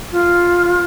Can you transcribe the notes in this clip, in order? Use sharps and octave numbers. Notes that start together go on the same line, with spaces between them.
F4